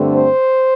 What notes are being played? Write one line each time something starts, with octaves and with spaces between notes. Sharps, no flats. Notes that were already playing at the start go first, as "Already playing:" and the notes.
Already playing: G2 D3 A3 C4
C5